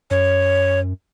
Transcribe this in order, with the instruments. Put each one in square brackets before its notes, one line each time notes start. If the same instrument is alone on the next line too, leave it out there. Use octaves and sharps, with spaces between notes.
[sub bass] F#2 [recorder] C#5